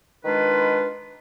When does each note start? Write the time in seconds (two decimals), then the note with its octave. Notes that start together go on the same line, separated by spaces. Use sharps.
0.25 D#3 G#3 D4 F4 B4